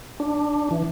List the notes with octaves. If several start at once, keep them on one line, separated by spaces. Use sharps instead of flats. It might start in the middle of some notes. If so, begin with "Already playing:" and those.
D4
E3